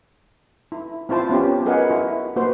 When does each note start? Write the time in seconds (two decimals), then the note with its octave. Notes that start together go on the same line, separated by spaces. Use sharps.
0.72 E4
1.09 C4 E4 F4 C5 A5
1.29 B3 C#4 F4 G4
1.66 F#4 G#4 A#4 B4 D#5 F#5
1.90 E4 F#4
2.36 A#3 F#4 B4 C5